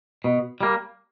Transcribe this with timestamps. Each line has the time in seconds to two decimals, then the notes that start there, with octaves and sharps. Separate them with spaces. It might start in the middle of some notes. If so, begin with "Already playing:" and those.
0.24 B2
0.61 G3 A#3